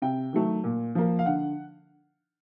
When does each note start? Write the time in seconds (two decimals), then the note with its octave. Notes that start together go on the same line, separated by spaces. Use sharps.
0.02 C3 G5
0.33 D#3 F#3 A3
0.64 A#2
0.95 F3 A#3
1.19 F5
1.26 D3 F#5